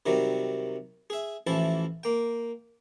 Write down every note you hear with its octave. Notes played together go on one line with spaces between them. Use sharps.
C3 D#3 F#3 G3
G#4 E5
A1 E3 F3 E4 A5
A#3 G5